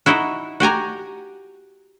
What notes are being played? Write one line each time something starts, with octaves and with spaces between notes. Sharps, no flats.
D#4 E4 F#4
F#4 G4 G#5 A#5